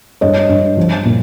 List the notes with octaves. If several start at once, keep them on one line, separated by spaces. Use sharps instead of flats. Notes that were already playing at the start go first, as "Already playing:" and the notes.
G2 C#5 D#5
G2
F3
A#2